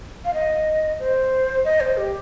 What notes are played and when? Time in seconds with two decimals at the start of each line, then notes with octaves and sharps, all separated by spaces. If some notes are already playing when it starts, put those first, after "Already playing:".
0.25 F5
0.34 D#5
1.00 C5
1.65 D#5
1.80 C5
1.97 G4